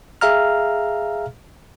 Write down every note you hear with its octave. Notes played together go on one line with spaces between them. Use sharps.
G#4 E5 F5 A#5 F6